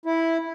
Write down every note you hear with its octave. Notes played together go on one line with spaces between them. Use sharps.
E4